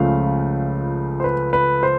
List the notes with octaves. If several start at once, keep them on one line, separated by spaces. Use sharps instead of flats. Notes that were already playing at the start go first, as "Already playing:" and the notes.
Already playing: C#2 C#3 F3 A3 F5
C5
B4
B4
C5